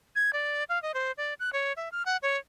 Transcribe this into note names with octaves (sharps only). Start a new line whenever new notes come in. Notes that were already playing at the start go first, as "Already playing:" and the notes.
G#6
D5
F5
D#5
C5
D5
F#6
C#5
E5
F6
F#5
C#5